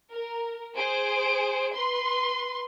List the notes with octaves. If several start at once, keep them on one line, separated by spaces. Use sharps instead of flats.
A#4
G#4 C5 D7
B4 C6